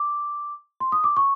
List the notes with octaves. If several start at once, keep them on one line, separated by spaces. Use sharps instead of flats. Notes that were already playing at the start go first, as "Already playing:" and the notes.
Already playing: D6
C6
D#6
D6
C#6